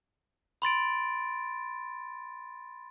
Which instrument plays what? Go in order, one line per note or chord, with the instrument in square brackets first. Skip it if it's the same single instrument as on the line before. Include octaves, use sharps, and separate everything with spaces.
[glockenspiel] B5 C6 A6 D7